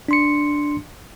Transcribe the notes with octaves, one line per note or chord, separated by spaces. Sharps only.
D4 C6 C#7